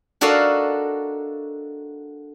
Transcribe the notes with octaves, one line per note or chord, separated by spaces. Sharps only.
D4 F#4 A4 A#4 D#5 F5